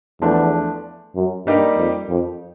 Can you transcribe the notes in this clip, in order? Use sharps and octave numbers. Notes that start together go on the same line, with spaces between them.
E2 F3 A3 D4
F#2
G2 G3 A#3 D#4 G4
F2
F2